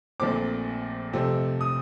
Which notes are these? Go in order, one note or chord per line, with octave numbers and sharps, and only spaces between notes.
A#1 A#2 A3 C4 D6
F2 C3 F3 A3 C4
D#6